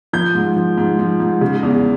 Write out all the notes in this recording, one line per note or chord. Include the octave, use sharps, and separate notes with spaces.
F3 G6
G#2
F3
G#2
F3
G#2
C#3
E2